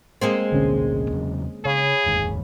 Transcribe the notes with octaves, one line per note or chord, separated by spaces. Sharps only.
G#3 A#3 C4 D#5 C7
A1 D2 B2 D3 C#4
E2 C#3 F#3
C#3 G#4 C#5 F5 B5
F1 D#2 G#2